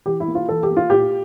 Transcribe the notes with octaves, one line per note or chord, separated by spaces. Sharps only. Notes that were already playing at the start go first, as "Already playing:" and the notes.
E3 G4
E4
A#3
F4
E3 A4
G4
A#3
F4
A#2 G4